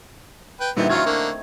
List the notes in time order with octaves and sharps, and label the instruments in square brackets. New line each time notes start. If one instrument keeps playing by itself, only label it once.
[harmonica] B4 G5
[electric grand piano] A#2 G3 D#4 [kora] D3 E3 C4 [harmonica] B3
[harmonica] F#3 F4 [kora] A3 D#4 [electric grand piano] C#6 F6 G#6
[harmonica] D3 A#3